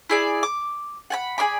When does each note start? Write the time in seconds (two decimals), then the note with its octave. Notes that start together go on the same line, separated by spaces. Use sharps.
0.10 E4 G#4 D5
0.43 D6
1.10 F#5 G#5 B5
1.38 G#4 B4 D5 B5